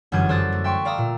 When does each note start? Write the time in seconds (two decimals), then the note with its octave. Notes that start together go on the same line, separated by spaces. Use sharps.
0.12 G1 F#2 E3 G6 G#6 D#7
0.29 A4 C5 D5 D#6 F#6 A6
0.52 A3
0.64 E5 G5 C6 C#6
0.85 D5 F5 A#5 D#6 E6
0.98 A#2